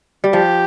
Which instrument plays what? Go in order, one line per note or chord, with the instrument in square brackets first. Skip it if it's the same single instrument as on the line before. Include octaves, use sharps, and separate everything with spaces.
[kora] G3
[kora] F3 [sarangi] G4